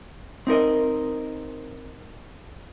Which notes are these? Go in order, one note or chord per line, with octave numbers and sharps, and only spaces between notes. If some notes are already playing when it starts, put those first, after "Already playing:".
C4 D#4 A#4 D#5